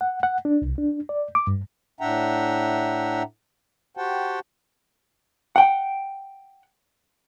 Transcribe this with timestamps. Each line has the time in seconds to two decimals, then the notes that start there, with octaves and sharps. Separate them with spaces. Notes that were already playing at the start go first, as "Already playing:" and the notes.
0.01 F#5
0.23 F#5
0.45 D4
0.62 C2
0.78 D4
1.09 D5
1.35 D6
1.47 G2
2.01 A2 D4 E5 F#5 G5 A#5
3.97 F#4 G4 C5 F#5 G5 A5
5.56 F#5 G5